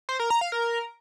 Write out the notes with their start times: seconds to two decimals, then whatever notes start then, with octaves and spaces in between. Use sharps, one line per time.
0.09 C5
0.20 A#4
0.30 A#5
0.41 F5
0.52 A#4